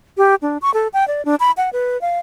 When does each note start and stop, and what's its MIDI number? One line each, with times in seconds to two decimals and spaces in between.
0.18 0.35 67
0.42 0.58 62
0.62 0.73 85
0.74 0.88 69
0.93 1.07 79
1.08 1.24 74
1.25 1.35 62
1.40 1.51 83
1.57 1.70 78
1.73 2.00 71
2.01 2.19 77